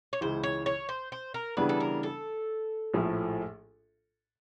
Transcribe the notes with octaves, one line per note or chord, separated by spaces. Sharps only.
C#5
C#2 C#3 E3 C5
C#5
C#5
C5
C5
A#4
C#3 E3 G3 B3 D4 B4
A4
A#4
A4
A#1 A2 F3 A3